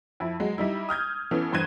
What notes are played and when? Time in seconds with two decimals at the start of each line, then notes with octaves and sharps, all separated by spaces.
0.20 F2 E4
0.40 F#3 G#3
0.58 G3 D#4 E4
0.89 D#6 F6 G6 G#6
1.31 E3 B3 C#4 A4
1.52 E2 G2 C5 F#6 G#6 D#7